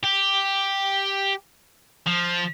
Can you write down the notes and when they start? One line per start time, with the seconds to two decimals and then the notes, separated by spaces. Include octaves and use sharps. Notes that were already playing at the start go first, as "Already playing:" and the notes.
0.03 G4
2.07 F3